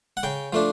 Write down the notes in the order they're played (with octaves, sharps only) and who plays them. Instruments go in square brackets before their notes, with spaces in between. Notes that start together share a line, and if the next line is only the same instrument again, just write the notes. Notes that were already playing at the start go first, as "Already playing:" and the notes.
[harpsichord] F#5
C#3 G5
F3 A3 D4